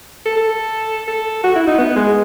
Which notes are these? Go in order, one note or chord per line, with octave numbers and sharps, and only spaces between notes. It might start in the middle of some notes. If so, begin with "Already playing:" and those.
A4
A4
A4
F#4
E4
D#4
B3
G#3